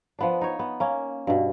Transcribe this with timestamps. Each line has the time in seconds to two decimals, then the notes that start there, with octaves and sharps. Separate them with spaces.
0.19 F3 B3 D4
0.41 D#4 C#5
0.59 B3
0.80 A#3 C#4
1.27 G2 B2